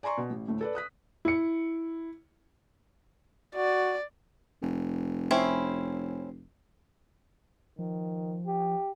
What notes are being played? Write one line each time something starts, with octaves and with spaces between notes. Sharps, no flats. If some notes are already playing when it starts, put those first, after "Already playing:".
D5 G#5 A#5 C6 C#6
B2
A1
D2 A2 A3
A4 B4 D5
D#6 F#6 B6
E4 C#7
F#4 D5
F1
C4 C#4 E4
D#3 F3
G4